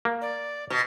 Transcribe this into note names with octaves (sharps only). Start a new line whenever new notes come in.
A#3
D5
B2